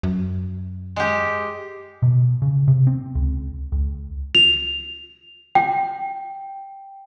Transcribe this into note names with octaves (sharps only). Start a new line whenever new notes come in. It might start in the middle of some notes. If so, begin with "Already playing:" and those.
F#2
G#3 G4
B2
C#3
C3
C4
C#2
C#2
F7
G5